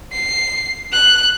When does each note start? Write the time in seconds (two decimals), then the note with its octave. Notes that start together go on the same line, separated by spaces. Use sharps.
0.12 C7
0.93 F#6